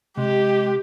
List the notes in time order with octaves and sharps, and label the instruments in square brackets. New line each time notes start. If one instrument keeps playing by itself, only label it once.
[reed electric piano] C3 [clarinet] G#3 [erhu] G4